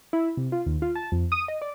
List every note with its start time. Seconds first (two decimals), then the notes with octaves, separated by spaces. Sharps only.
0.13 E4
0.37 C3
0.52 F4
0.66 D#2
0.82 F4
0.95 A5
1.12 F2
1.32 D#6
1.48 D#5
1.62 D5